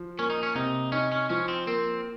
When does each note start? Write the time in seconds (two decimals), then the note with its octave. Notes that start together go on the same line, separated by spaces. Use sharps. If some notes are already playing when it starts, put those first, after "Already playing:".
Already playing: F3
0.18 A#3 C#4
0.30 D#4
0.43 C#4
0.55 C3 D#4
0.92 C#4 D#4
1.12 C#4
1.29 F3 C#4
1.48 C4
1.67 A#3 C4